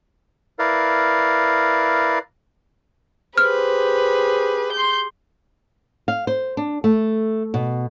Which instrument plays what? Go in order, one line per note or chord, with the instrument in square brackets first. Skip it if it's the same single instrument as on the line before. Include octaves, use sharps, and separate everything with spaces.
[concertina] E4 A#4 B4 D5 F5
[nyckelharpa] G4 G#4 [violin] B4 [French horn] C5 [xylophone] F6
[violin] C6 G6
[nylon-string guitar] F5
C5
D4
A3
B2